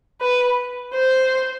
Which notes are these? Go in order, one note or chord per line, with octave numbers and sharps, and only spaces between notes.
B4
C5